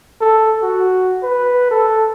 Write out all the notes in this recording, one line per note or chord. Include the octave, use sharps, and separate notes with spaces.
A4
F#4
B4
A4